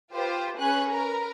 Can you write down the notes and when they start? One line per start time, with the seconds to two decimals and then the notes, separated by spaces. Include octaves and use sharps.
0.13 F4 G4 B4 C5
0.59 C#4 G#4 B4 F#6
0.91 A#4 B4 A#5